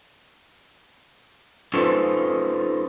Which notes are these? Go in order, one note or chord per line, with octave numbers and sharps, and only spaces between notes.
C#4 D#4 F4 A4 B4 C5